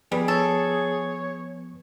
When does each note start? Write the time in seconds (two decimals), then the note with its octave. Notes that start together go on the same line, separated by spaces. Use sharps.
0.12 F3 G3 B3 G#4 B4
0.28 A4 C#5